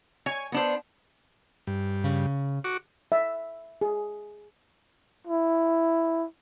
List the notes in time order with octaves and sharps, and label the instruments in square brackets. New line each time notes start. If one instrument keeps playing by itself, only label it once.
[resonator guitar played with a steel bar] C#5 G#5
B3 D4 C5
[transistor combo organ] G2
[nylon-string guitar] C#3
[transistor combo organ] F#4 C#6 D6
[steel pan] E5
G#4
[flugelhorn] E4